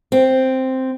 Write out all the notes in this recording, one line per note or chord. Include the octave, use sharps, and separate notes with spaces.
C4